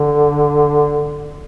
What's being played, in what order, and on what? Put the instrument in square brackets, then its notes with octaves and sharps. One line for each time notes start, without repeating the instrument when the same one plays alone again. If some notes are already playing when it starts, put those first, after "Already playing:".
Already playing: [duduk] D3